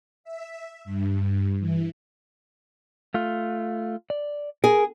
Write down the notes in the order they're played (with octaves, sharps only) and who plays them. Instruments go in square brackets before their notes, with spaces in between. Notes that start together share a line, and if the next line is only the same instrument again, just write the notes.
[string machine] E5
G2
E3
[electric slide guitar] A3 F4
D5
[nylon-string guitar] G#4 [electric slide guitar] A#4